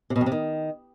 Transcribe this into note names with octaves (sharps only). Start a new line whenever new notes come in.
C3
B2
F2
C3
D#3